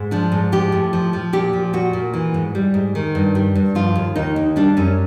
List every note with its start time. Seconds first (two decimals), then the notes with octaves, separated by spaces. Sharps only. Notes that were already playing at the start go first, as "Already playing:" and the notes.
Already playing: G#2
0.11 F3 D4
0.32 G#2
0.52 F3 G4
0.72 A2
0.93 F3
1.13 F3
1.33 A#2 G4
1.53 F3
1.73 A#2 F#4
1.93 A#2
2.14 E3
2.34 G#2
2.55 G3
2.74 G#2
2.95 D#3
3.15 G2
3.35 G3
3.55 G2
3.75 F3 F4
3.96 D#2
4.16 D#2 D#4
4.36 D#2
4.56 G3 D4
4.77 F#2 C#4